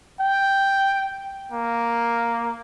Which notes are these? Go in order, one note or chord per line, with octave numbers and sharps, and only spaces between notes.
G5
A#3